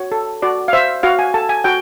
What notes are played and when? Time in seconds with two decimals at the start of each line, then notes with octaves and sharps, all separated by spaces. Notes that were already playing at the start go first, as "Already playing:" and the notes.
Already playing: F#4 C#5
0.12 A4
0.42 F#4 D5
0.68 F5
0.73 C5 E5
1.03 F#4 F5
1.19 G#5
1.34 A4 A5
1.49 G#5
1.64 F#4 G5